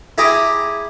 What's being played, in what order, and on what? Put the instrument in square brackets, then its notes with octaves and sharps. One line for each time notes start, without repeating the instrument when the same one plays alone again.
[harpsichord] E4 G4 G#4 A#5 D6